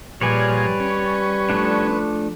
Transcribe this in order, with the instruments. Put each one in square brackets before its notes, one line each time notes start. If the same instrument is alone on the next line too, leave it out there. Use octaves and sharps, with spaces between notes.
[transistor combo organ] A#2 F3 G#4 [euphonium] G3 [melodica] B4 [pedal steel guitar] C#5 D5 G#5
[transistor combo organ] C#4
[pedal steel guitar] F3 A3 D4